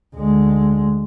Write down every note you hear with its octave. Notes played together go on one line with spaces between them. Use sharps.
D2 G#3